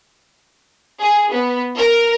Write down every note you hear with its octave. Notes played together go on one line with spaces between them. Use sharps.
G#4
B3
A#4